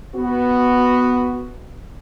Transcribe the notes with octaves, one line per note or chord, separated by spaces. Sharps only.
B3 F#4